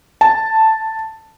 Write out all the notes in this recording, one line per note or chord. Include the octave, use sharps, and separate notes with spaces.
A5